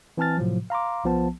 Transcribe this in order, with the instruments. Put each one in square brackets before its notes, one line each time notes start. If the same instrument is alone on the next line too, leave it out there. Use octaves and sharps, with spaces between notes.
[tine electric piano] E3 C4 G#5 A5 F6 A6
A2 C3 F3 F#3
F5 A#5 C6 D6
B1 F3 B3 A5